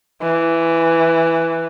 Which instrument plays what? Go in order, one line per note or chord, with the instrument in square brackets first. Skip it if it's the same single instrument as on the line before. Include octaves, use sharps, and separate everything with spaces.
[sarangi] E3